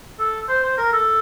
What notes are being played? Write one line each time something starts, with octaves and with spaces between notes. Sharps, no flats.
A4
C5
C5
A#4
A4